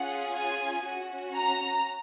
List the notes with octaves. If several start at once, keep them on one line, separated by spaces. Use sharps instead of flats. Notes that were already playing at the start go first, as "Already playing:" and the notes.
Already playing: C#4 F4 G#4 F#5
G#5
C#4 F#4
A#5